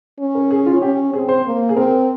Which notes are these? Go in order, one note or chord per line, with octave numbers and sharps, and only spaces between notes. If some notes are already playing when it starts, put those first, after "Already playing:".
C#4
A#4
G#4
F4
C#4 G4
C4 G#4
C5
A#3
G#4
C4 A#4